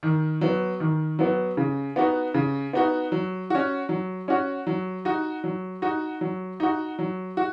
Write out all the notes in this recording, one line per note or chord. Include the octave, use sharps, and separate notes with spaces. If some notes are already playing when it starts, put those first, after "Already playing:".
D#3
F#3 B3
D#3
F#3 B3
C#3
B3 D#4 F#4
C#3
B3 D#4 F#4
F#3
C#4 F#4
F#3
C#4 F#4
F#3
D#4 F#4
F#3
D#4 F#4
F#3
D#4 F#4
F#3
F#4